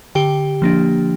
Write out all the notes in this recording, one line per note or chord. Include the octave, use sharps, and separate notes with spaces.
D3 G4 G5
F3 A#3 D4